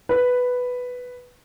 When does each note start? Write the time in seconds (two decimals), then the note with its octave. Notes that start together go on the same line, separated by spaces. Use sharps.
0.09 B4